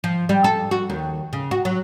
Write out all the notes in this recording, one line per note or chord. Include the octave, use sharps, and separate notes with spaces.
F3
G3
A4
F#4
D#2
C#3
F#4
F#3